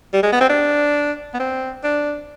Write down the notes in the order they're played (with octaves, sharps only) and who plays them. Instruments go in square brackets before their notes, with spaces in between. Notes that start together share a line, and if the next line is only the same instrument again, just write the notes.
[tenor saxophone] G3
G#3
B3
C4
D4
B3
C4
D4